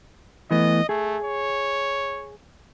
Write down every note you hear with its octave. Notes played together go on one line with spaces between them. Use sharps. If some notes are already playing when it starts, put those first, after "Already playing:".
E3 A3 B3 D#5
A3 G#4
C#5